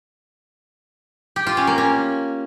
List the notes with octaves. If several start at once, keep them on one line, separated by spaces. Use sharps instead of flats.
G4
F4
C#4
A#3
C#4